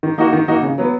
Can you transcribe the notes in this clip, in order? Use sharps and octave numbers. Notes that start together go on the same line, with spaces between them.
D#3
A#3 D#4 F#4
D#3
A#3 D#4 F#4
C#3
F#3 B3